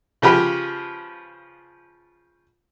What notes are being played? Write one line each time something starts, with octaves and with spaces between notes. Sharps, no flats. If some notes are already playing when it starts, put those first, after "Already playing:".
C#3 F3 G4 B4